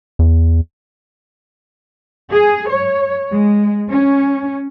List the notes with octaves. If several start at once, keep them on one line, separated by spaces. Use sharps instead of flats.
E2
G#4
C#5
G#3
C#4